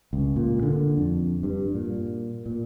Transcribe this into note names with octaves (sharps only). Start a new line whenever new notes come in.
C#2
A#2
D3
F2
G2
A#2
A#2